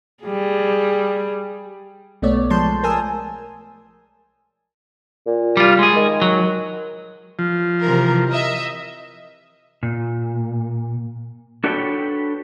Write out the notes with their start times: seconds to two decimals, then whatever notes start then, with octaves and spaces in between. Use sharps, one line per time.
0.24 G3 G#4
2.22 B1 A3 B3 C#5 D5
2.50 F3 G#3 A5 C6 G6
2.83 A#4 G#5 A5 D#6 E6
5.27 A#2
5.57 G3 F4
5.79 G#3 G#4
5.96 D#3
6.22 F#3
7.39 F3
7.81 C3 E3 A#4
8.30 D#5 E5
9.83 A#2
11.64 D4 F#4 A4 B4 C#5 G5